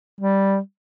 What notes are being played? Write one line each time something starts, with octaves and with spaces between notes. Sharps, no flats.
G3